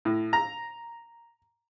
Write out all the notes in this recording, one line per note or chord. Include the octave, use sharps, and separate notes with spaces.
A2
A#5